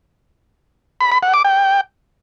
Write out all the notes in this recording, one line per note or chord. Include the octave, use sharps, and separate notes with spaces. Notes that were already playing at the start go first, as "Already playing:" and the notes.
B5
B5
F#5
D6
G5